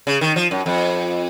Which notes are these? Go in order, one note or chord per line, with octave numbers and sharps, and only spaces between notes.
C#3
D#3
F3
F#2
F2